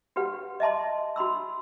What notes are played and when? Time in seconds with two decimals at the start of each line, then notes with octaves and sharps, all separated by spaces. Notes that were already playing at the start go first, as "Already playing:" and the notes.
0.16 F#4 G4 B4 F#5
0.60 D#5 E5 A5 C6
1.16 F#4 B5 C6 E6